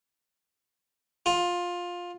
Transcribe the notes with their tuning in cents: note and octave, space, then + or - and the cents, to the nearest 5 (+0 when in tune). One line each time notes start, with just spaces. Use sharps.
F4 +15